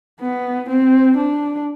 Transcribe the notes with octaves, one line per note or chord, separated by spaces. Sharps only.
B3
C4
D4